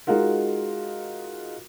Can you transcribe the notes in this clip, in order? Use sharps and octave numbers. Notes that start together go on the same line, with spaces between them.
G#3 D#4 F4 F#4 A#4